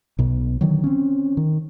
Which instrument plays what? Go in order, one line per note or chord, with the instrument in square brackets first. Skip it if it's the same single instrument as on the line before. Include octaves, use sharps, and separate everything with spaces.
[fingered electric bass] B1 B2
D3 D#3 F#3
C4 C#4
D#3